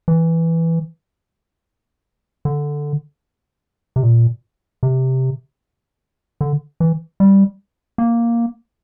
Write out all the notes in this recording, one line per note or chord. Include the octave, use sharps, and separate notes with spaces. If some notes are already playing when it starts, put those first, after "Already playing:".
E3
D3
C3
A#2
C3
D3
E3
G3
A#3